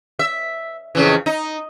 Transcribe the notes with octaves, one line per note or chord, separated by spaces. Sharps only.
E5
F2 C#3 E3
D#4